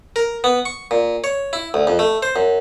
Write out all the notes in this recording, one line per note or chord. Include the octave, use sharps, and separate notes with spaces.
A#4
B3
C#6
A#2
C#5
E4
D2
F2
A3
C5
F#2